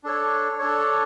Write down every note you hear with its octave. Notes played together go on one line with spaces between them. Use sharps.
D4 A4 C#5
D4 A4 C#5